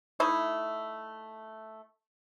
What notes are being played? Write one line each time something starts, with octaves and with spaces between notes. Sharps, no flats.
A3 D#4 E4